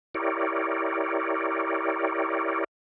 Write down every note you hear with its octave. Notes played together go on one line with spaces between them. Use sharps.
E4 G4 A#4 C#5 D5